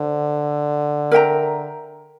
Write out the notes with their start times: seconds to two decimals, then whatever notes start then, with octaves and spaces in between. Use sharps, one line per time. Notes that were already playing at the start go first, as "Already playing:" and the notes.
Already playing: D3 C5
1.12 A#4 E5 G5 A#5